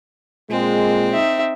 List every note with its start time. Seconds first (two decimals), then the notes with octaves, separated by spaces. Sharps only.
0.50 A#2 G#3 C4
1.12 D#4 E5